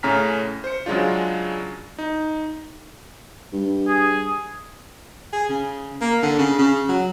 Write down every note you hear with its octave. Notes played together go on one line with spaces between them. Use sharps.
A2 C#3 C#4 A#5 F6 B6
C5 C#7
C#3 F#3 G#3 D4 F4
D#4
G2
G#4
G#4
C#3
A#3
D3
C#3
C#3
F#3